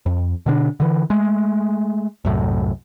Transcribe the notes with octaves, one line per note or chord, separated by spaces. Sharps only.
F2
B2 D3 D4
D3 E3
G#3 A3
C2 F#2 A2